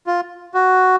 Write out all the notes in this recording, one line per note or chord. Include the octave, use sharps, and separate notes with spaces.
F4
F#4